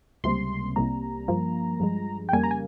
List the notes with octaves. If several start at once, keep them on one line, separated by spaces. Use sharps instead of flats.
C#2 C3 G3 A#3 C6
C2 C3 G3 A#3 A#5
G2 F3 A#3
G2 F3 G#3
G5
F2 C#3 G3 A#3 G#5
A#5
G#5